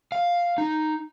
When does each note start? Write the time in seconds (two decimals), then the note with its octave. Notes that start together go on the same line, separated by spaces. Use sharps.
0.12 F5
0.58 D#4